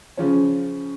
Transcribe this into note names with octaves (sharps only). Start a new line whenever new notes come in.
C#3 F3 C#4